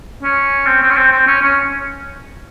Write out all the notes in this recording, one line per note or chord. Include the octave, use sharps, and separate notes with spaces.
C#4
C4
C4
C#4
C4
C4
C#4
C#4